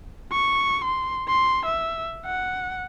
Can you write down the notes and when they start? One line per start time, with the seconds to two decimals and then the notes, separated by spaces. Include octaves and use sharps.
0.32 C#6
0.84 C6
1.28 C6
1.65 E5
2.26 F#5